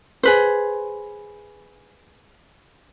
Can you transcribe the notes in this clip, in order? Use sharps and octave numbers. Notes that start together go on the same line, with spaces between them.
G#4 B4 C5